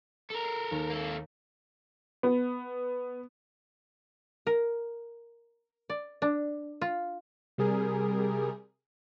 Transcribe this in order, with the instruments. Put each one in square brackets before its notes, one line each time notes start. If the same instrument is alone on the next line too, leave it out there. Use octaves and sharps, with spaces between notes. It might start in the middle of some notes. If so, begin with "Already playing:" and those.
[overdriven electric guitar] A4 A#4
[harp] C7
D#2
[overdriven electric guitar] A#3 A4
[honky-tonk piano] B3
[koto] A#4
D5
D4
F4
[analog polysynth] C3 G3 G#4 A#4